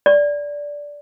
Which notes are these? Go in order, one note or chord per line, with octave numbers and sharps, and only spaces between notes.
D5